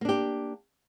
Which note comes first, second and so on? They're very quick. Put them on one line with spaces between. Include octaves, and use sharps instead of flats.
A#3 D4 G4